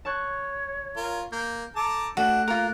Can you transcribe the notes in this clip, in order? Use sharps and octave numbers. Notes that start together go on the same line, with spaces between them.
C#5 A5 C#6 F#6
F4 A#4
A#3 G6
A4 A5 A#5 D6
A3 D4 F#4 F#6
A#3 F4 A#4